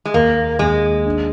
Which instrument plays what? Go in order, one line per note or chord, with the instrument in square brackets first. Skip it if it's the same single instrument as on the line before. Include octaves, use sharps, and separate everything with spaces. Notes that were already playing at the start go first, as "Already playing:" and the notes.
[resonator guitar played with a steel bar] G#3
[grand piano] D#2 [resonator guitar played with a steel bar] A#3
[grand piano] D#2 [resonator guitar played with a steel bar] G#3
[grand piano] D4